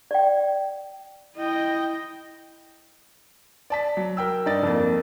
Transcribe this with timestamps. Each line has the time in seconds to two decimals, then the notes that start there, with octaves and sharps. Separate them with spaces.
0.11 D5 G5
1.36 E4 D#5 G5
3.70 D5 A5 B6
3.97 F#3
4.17 A#4 G5 E6
4.46 G2 D#4 D5 A6
4.63 F2 A#3